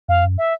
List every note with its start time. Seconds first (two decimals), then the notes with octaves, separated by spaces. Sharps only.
0.09 F2 F5
0.24 F#2
0.38 E5